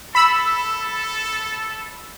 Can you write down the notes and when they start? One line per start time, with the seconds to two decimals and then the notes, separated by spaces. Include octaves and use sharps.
0.15 A4 B5 E6